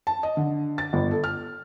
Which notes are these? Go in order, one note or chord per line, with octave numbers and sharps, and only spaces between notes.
A5
D#5
D3
A6
G1
A4
F6